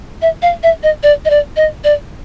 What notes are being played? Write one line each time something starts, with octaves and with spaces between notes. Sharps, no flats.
E5
F5
E5
D#5
D5
D#5
D5
D#5
D5